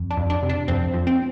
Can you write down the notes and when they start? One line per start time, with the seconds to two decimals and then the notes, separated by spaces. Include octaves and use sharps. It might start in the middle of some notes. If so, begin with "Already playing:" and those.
Already playing: F2
0.11 D4
0.17 F2
0.30 D4
0.43 C3
0.49 D4
0.68 F2 C4
0.94 F3
1.07 C4